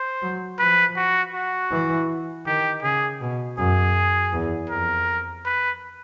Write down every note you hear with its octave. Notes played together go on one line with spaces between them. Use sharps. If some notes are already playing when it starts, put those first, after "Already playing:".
Already playing: C5
F#3
F3 B4
F#4
F#4
E3
D#3 G4
C#3 G#4
B2
F#2 G#4
E2
F2 A#4
B4